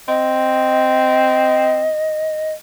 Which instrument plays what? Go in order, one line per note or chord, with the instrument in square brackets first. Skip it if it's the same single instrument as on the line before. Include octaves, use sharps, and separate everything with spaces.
[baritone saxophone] C4 [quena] D#5